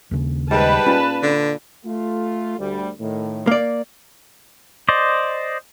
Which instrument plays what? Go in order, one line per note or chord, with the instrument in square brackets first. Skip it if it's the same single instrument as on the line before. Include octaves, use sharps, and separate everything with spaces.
[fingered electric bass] D#2 C#3
[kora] G#2 [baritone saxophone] G3 [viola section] B4 A5
[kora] A#2 [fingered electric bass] C#4
[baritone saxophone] D3
[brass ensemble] A3 F4
D2 G3
A2 D#3
[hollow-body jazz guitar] A#3 D5
[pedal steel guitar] C5 D5 D#5